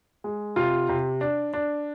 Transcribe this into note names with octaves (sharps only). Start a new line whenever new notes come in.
G#3
C3 F4
C3
D4
D4